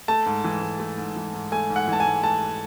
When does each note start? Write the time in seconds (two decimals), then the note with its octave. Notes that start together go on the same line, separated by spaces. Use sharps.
0.08 A3 A5
0.26 G#2
0.44 E3
0.62 G#2
0.80 A3
0.98 G#2
1.16 E3
1.34 G#2
1.52 A3 G#5
1.70 G#2
1.76 F#5
1.88 E3 A5
2.00 G#5
2.06 G#2
2.24 A3 A5